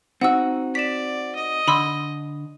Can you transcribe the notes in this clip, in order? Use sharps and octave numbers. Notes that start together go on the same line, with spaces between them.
C4 D#4 F#4 F#5 E6
D5 B6 E7
D#5
D3 B5 C6 E6